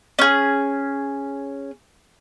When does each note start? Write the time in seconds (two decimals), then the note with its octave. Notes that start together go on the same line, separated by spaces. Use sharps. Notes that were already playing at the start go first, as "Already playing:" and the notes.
0.19 C#4 G#4